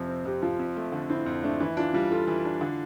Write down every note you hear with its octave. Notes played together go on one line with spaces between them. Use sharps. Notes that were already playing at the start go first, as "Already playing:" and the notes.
Already playing: F2 C3 F3
C4
F2 G4
F3 F4
F2
A3
D3
C4 E4
F2
A3 D4
E3 E4
D4 F4
G3 F4
F4 A4
E3
D4
D3